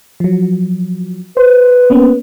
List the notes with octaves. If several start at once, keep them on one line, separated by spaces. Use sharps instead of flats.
F3 F#3
B4 C5
A#3 B3 C#4